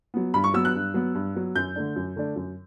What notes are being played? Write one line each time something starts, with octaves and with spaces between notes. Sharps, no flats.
F#3 B3
G2 B5
C#6
F#3 B3 E6
F#6
G2
F#3 B3
G2
F#3 B3
F#2 G6
D3 A3 D4
F#2
D3 A3 D4
F#2